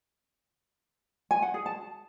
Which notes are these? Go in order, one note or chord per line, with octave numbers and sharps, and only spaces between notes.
G#5
F#5
G#4
A5